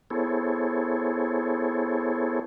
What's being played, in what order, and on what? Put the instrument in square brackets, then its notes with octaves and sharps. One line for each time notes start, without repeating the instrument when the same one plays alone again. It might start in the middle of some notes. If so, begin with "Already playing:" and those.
[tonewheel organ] B3 E4 G#4 A4 C5 C#5